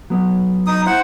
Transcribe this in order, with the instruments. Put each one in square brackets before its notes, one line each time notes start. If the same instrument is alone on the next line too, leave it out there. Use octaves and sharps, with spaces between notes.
[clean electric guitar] F#3 B3
[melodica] D#4 D#6
[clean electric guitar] E4 [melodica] C5 F#5